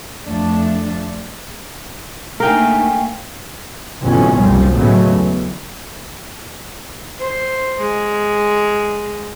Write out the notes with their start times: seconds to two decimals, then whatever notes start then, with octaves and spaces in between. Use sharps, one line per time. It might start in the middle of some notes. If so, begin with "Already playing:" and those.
0.23 F2 F3 A3 D4
2.40 A3 A#3 D4 D#4 A#4 F5 G5 G#5
4.02 A1 F2 B2 D3 F#3 C#4
4.36 F#1 C2 F3 G3
4.74 A2 C#3 F#3 G#3 A3 B3
5.10 E2
7.19 C5
7.79 G#3